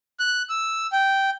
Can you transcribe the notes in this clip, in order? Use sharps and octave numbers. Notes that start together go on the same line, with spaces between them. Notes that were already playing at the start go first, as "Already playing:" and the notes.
F#6
E6
G5